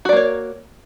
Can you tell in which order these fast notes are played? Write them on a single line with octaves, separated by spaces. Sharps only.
F#4 D5 A#3 C#5